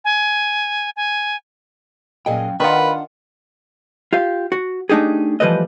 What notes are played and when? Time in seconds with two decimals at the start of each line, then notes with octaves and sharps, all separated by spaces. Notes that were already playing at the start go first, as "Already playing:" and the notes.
0.05 G#5
0.96 G#5
2.26 F#2 A#2 G#4 D#5 F5 G5
2.60 D#3 D4 F4 A#4 B4 F#5 B5
4.13 F4 G4 F5
4.52 F#4
4.89 A3 D4 D#4 G4 G#4
5.40 E3 F3 G3 A3 B4 D#5